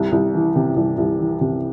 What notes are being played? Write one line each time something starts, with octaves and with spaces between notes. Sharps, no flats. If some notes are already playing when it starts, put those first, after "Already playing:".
Already playing: C2
C2
E3
C3
C2
C2
E3
C3